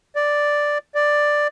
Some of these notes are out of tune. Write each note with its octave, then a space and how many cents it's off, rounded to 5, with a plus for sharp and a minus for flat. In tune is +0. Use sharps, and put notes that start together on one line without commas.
D5 +0
D5 +5